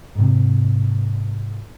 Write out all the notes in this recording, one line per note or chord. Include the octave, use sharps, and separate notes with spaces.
G#2 C3